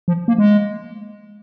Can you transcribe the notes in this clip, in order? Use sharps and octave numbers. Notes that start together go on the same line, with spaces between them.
F3
A#3
G#3